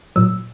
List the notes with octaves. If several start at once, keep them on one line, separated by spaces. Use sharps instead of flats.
A#2 F#3 E6